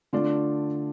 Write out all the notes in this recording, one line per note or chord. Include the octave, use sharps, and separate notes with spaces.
D3 A3 F4 D5